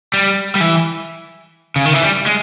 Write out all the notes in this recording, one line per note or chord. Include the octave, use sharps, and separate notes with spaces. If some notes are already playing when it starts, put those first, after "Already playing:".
G3
G3
E3
C#3
D#3
E3
G3
G#3